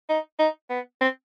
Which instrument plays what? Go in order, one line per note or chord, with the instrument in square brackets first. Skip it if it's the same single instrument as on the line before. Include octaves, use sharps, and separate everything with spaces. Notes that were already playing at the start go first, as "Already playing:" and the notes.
[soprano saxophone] D#4
D#4
B3
C4